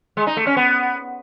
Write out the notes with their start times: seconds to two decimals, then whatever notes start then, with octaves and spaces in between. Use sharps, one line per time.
0.17 G#3
0.27 D#4
0.37 A3
0.47 C#4
0.57 B3